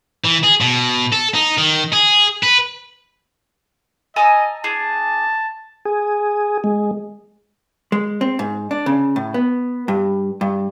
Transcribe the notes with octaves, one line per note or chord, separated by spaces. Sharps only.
E3
G#4
B2
A4
D#4
D#3
G#4
B4
A4 D#5 G#5 A#5
D4 G#4 A5
G#4
G#3
G#3
C4
G#2
D4
C#3
A2
B3
G2
G2